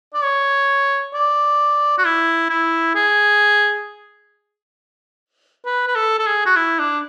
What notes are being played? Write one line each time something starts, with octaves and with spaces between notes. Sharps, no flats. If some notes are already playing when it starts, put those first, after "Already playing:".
D5
C#5
D5
F#4
E4
E4
G#4
B4
B4
A4
A4
G#4
F#4
E4
D4